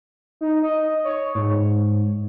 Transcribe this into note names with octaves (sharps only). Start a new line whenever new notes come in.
D#4
D#5
C#5
G#2